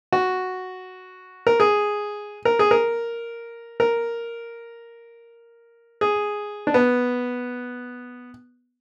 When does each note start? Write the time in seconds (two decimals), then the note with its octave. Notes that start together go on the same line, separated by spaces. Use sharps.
0.13 F#4
1.47 A#4
1.60 G#4
2.45 A#4
2.59 G#4
2.71 A#4
3.80 A#4
6.01 G#4
6.67 D4
6.74 B3